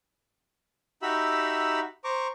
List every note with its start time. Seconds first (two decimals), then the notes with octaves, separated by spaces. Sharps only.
1.02 D#4 F#4 G4 E5 B5 E6
2.04 C5 A#5 C#6 D6